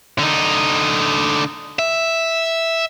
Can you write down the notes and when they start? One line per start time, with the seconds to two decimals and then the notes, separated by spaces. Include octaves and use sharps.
0.19 D3 D#4
1.79 E5